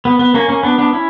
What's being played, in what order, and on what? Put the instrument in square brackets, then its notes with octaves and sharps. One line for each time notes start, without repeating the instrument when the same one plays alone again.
[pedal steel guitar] B3
B3
A#3 C#4
A#3 C#4
B3 D4
B3 D4
C#4 E4